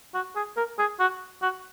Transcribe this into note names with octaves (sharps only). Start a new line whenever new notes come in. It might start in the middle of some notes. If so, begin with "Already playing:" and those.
F#4
G#4
A#4
G#4
F#4
F#4